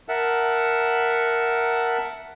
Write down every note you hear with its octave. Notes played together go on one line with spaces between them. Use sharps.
A#4 E5 F#5 A5